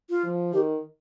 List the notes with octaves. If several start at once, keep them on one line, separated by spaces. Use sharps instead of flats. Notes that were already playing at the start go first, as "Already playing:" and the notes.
F4
F3
D#3 G4